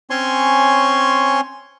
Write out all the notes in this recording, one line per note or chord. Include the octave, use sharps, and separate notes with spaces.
C4 C#4 C#5 G#5 C6 C#6